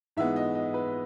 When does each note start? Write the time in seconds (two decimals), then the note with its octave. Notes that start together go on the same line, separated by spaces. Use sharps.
0.17 G#2 E3 G#3 B3 E5
0.36 D#5
0.55 D#5
0.74 B4